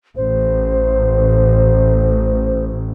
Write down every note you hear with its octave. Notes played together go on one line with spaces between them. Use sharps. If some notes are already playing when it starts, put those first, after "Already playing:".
A1 C5